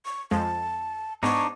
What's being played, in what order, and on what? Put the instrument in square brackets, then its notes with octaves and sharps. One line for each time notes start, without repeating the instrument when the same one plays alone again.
[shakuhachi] C#6
[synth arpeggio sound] F2 F3 G#3 [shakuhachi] A5
[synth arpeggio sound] G#2 B3 [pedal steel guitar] D4 D#4 [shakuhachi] C#6